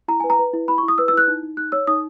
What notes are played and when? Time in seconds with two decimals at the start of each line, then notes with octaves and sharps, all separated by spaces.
0.08 E4 A#5
0.20 B4 G#5
0.30 A#5
0.39 B4
0.53 E4
0.68 E4 B5
0.78 C#6
0.83 E4
0.88 D#6
0.98 B4 E6
1.08 E6
1.13 E4 F#6
1.28 D#4
1.43 D#4
1.57 D#4 F#6
1.72 C#5 E6
1.87 D#4 D#6